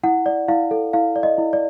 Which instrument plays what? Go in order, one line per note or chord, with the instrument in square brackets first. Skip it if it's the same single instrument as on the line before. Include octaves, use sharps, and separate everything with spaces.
[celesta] E4 F#5
D5
E4 F5
A4
E4 F5
D5
D#5
E4
D5